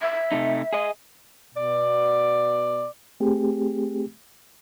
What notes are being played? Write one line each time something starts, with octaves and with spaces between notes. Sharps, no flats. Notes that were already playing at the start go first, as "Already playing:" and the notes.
E5
C3 A3 D#4
G#4 D#5
B2 D5
A3 C4 G4 G#4